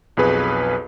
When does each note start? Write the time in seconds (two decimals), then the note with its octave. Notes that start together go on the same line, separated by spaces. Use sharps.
0.17 B1 F2 G#4 B4